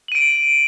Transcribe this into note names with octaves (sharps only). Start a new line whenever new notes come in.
D7 D#7 F#7